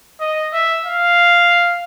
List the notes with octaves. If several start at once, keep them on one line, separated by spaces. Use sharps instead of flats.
D#5
E5
F5